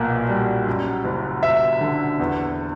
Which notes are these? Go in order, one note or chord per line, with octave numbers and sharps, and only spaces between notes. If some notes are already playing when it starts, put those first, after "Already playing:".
Already playing: B1 A#2 A#3
G3
F#2
F#1
F#1 E5
D3
E2